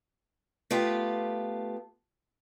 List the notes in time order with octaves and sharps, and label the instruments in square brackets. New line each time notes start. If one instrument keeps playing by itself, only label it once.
[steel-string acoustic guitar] A3 B3 F4 G4